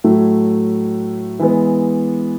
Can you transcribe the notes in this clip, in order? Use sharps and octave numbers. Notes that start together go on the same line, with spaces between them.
A2 F#3 A3
E3 G#3 B3